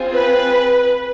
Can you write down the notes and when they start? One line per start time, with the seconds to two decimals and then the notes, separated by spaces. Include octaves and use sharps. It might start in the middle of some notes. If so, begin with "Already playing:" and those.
Already playing: C4 F4 G#4
0.14 B4